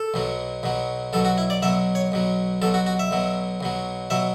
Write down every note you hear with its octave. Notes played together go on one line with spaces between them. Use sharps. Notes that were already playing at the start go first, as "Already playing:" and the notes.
Already playing: A4
B1 B2 F#3
B1 B2 F#3
B1 B2 F#3 A4
F#4
E4
D5
B1 B2 F#3 E5
C#5
B1 B2 F#3
B1 B2 F#3 A4
F#4
F#4
E5
B1 B2 F#3
B1 B2 F#3
B2 F#3 E5